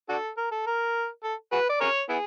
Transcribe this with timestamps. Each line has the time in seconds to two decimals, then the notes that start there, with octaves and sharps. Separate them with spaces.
0.09 D4 F#4 A4
0.37 A#4
0.52 A4
0.67 A#4
1.24 A4
1.52 F#4 G#4 B4
1.69 D5
1.81 G#4 A#4 C#5
2.09 B3 E4 G#4